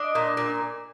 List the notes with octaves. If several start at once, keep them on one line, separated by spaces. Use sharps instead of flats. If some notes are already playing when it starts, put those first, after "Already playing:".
Already playing: D4 D#5
A#2
A#2